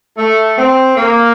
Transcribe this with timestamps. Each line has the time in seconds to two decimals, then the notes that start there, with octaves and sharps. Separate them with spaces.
0.18 A3
0.58 C4
0.97 A#3